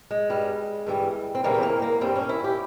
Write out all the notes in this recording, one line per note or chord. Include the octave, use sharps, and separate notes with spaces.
G#3
G2 G3
G2 E3 G3
C4
E2 C#3 E3 G3 A#3
C4
A#3
A#3
G2 G3 C4
C#4
E4
G4